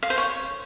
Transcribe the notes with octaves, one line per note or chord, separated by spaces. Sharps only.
F5
C5
C#5